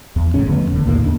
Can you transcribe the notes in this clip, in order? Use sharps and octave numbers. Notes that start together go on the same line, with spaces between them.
E2
G#1 A2 C#3 C#4
F2 D3 A3 B3
D#1 D3
A#1 D#2 A2 A#3
D#2 D4